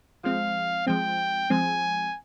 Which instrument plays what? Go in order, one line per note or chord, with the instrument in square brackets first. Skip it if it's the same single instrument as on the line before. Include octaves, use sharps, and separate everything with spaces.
[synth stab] F3 G#3 C4 [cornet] F5
[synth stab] F3 G#3 C4 [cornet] G5
[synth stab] F3 G#3 C4 [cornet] G#5